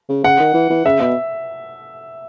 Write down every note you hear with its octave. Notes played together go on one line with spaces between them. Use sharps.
C#3
C#3 F#5
D#3
E3
E3
C#3 E5
B2 E5